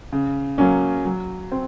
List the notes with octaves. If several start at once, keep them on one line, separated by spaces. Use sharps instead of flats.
C#3
F#3 A#3 C#4
F#3
C4